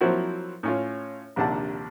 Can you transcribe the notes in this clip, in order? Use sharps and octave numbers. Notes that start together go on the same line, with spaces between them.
F3 F#3 A#3 C4 E4 F#4
A2 C#4 F4
A#1 D#2 C3 D4 F#5 A5